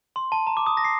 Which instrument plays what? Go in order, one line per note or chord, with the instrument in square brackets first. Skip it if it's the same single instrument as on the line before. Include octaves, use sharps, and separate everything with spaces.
[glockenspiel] C6
A5
A#5
D6
D#6
A#6
C7